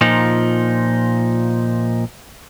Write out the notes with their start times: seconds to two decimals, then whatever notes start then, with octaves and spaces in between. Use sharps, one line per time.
0.01 A#2 F3 D#4